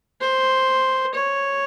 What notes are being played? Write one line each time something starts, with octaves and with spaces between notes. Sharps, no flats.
C5
C#5